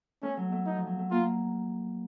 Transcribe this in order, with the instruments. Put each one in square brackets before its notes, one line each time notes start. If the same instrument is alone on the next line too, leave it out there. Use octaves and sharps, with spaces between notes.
[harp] A3 [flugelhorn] C#4
[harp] F#3
A3
[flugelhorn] D#4
[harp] F3
F#3
A3
[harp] A#3 [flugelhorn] F4